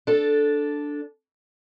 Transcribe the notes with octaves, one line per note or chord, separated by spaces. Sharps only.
D4 A4